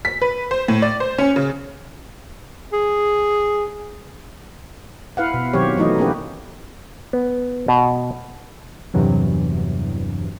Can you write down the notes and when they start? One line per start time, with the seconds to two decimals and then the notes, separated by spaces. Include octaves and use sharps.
0.05 B6
0.22 B4
0.51 C5
0.68 A2
0.82 D5
1.00 C5
1.18 C#4
1.36 C#3
2.73 G#4
5.17 E4 B4 F5 F#5
5.34 B2
5.53 B2 D#3 F#3 C4 G4 C#5
5.77 E3 F#3 A3 D#4 E4 D#5
5.98 A#3 C#4 E4 F#4 G4 B4
7.13 B3
7.68 B2
8.94 E2 G2 C3 E3 F#3